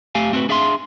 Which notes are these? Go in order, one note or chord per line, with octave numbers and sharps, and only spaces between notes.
A3 G4 F5 G#5
A3 C4 F4 F#4 B4
D4 G#4 E5 F5 B5 C6